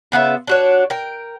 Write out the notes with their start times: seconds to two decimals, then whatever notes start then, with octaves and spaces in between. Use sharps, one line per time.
0.12 C#3 B3 F4 E5
0.47 D4 F#4 C#5
0.90 A#4 G5